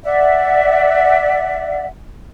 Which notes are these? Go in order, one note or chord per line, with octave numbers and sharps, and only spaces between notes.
D5 E5 F#5